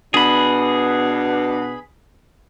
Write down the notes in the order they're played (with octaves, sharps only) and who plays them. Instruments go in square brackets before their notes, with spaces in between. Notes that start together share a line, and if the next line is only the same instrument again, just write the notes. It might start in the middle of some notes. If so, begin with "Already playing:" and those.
[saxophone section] B2 B3 D4 [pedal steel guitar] G#4 B5